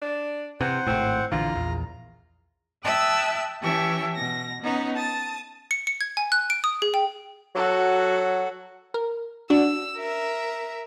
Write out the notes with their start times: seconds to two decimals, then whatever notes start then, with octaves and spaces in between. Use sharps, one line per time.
0.02 D4
0.61 C3 E3 C5 F#5
0.87 G#1 A2 C4
1.32 A#1 D3 E3 F4 A#5
1.53 A#1 E2
2.83 E5 G5 A5 D#6 E6 F#6
3.61 E3 C#4 G4 E5 A5 C#6
4.15 B2 A#6
4.62 B3 C#4 D#4
4.94 A5 D#6 A6
5.71 C#7
5.87 C#7
6.01 G#6
6.17 G#5
6.32 F#6
6.50 D7
6.64 D#6
6.82 G#4
6.94 G5
7.55 F#3 F#4 A4
8.94 A#4
9.50 D4 F#4 E6
9.97 A#4 E5